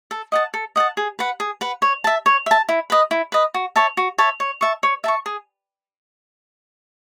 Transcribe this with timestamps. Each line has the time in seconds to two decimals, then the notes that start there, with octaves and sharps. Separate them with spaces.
0.11 A4
0.32 D#5 F#5 A5
0.54 A4
0.76 D#5 F#5 A5
0.97 G#4
1.19 B4 F#5
1.40 G#4
1.61 B4 F#5
1.82 C#5
2.04 E5 A5
2.26 C#5
2.46 E5 A5
2.69 E4
2.90 B4 D#5
3.11 E4
3.32 B4 D#5
3.54 F#4
3.76 C#5 E5 A5
3.97 F#4
4.18 C#5 E5 A5
4.40 C#5
4.61 E5 A5 C#6
4.83 C#5
5.04 E5 A5 C#6
5.26 G#4